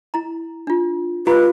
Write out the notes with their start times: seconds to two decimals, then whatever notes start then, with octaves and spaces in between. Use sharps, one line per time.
0.14 E4 A#5
0.67 D4 F4
1.27 F4 G4 B4 A#5 B5